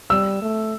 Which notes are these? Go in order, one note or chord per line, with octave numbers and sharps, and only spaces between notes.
G3 E6
A3